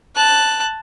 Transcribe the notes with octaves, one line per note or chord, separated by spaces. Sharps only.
A5 F#6